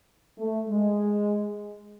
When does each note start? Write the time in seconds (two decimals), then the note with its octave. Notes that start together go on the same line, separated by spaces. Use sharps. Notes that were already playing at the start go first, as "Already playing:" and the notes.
0.38 A3
0.69 G#3